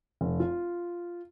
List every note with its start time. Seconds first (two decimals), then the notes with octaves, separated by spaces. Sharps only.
0.21 F1
0.40 F4